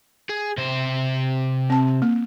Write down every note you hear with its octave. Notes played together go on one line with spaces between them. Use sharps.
G#4
C3 C5
C4 A5
A#3